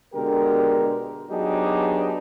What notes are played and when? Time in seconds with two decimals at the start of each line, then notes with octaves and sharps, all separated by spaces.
0.14 B2 D3 G#3 G4 A#4
1.30 F#3 B3 D4 D#4 G4 G#4